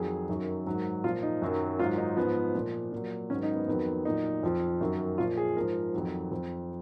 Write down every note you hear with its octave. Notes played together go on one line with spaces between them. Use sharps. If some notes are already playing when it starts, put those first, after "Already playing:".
Already playing: F2 D#3 F#3 G#4
F#2 D#3 F#3
G#2 D#3 F#3
A#2 F3 F4
D#4
F#2 D#3 F#3
G#2 D#3 F#3 F4
D#4
G#2 F3 B3
A#2 F3
A#2 F#3
G#2 D#3 F#3 C#4
D#4
B3
F2 D#3 F#3 B3
A#2 F#3 D#4
F2 F3
F#2 D#3 F#3
A#2 F3 F4
G#4
G#2 F3 A#4
F2 D#3 F#3
F2 F3